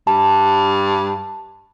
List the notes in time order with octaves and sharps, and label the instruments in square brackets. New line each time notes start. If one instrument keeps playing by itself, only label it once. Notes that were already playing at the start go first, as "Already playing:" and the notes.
[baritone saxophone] G2 [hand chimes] A5